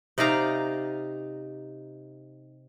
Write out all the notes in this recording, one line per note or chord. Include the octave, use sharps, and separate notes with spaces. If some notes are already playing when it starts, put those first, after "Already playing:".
C3 D#4 D5 F5 A#5